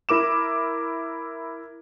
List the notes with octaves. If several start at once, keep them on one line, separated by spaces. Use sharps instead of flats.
E4 A#4 D6 E7